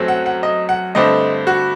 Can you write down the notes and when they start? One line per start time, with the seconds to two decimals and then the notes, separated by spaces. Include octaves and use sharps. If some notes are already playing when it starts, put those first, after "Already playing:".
Already playing: F#2 F#3 A3 C4
0.08 F#5
0.26 F#5
0.43 D#5
0.69 F#5
0.95 G2 D3 A3 C4 D#5
1.47 F#4